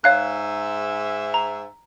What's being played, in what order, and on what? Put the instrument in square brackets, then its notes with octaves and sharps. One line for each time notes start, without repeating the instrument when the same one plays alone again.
[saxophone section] G#2 E5 [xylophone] C#5 F5 F#6
[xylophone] A#5